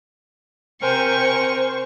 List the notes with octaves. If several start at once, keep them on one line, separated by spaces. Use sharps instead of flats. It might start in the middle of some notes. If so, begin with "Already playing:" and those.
C3 A#4 C5 G5 G#5 C#6